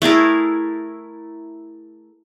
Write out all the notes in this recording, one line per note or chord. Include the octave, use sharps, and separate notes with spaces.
A3 E4 G#4 A#4